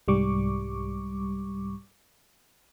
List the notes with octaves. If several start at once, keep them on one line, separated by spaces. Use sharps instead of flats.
C2 G#2 G3 C#6 D6